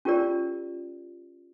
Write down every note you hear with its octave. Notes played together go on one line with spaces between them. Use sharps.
C#4 F4 G4 A#4 D5